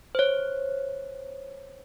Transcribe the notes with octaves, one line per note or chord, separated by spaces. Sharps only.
C5 C#5